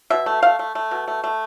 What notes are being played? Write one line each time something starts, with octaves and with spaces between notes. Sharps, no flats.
B2 E5
A3
A3 F5
A3
A3
B2
A3
A3